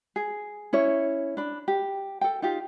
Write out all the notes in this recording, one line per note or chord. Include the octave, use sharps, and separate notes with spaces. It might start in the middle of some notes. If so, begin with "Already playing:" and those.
G#4
C#4 E4 C#5
D4 B5
G4
A4 G5
D#4 F4 G4